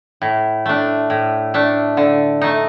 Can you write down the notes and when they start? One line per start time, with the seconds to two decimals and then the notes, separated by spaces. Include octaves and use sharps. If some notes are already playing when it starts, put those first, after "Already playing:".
0.22 A2
0.66 A3 D4
1.10 A2
1.54 A3 D4
1.97 D3
2.41 A3 D#4